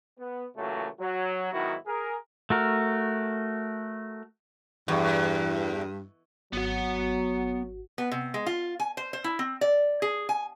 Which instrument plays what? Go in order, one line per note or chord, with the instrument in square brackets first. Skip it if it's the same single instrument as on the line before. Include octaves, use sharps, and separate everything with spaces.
[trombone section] B3
A#2 C#3 E3 F#3 A3 F#4
F#3
G#2 D#3 F#3 B3 E4 F#4
G#4 A#4
[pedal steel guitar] A3 F#4 A#4
[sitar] E2 [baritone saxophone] G2
[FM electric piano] G#1 F#4 [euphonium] F#3 [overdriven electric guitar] B3 F#5
[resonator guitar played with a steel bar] B3
C3
G#3
F4
G#5
C5
C5
E4
C4
D5
G#4
G#5